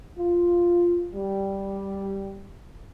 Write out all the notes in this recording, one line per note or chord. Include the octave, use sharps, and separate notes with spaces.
F4
G3